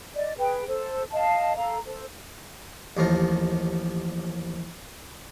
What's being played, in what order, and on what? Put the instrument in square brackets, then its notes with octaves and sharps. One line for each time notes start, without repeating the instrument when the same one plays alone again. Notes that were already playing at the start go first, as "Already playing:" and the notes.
[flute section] D5 D#5
G#4 B4 G5
A4 C5
D#5 F5 A5
A4 F5 A#5
A4 C5
[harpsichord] A1 D#2 F3 A#4